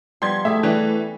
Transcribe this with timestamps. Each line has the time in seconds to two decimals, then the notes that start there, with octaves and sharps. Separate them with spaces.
0.22 F3 G3 B3 C6 G#6
0.45 A3 E4 G4 G#4 E5
0.63 E3 G3 C#4 B4